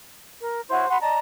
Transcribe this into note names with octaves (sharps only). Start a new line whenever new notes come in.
A#4
E4 F#4 C5 C#5
F#4 F#5 B5 C6
D5 D#5 A5 A#5